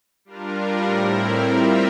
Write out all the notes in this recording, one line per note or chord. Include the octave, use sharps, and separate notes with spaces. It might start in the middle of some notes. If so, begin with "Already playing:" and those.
G3 D4 F4 A#4
A2 G3 C4 E4 A#4
G3 C4 F4 A#4 E5